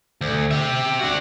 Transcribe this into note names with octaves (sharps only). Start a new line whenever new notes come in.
D2
G4 E5
D4 F#4